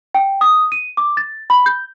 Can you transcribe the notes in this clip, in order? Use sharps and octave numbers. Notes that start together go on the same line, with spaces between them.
G5
D#6
D#7
D6
A6
B5
G6